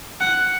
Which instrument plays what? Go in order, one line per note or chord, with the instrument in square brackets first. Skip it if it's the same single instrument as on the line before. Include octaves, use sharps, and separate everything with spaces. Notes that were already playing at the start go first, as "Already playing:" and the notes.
[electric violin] F#5